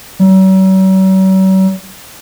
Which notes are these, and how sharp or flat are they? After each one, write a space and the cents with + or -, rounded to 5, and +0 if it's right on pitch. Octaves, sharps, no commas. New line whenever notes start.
F#3 +45